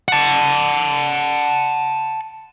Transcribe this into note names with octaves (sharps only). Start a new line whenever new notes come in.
F#5 A5